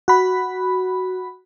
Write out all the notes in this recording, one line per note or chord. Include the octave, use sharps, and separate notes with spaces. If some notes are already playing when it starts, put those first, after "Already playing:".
F#4 B5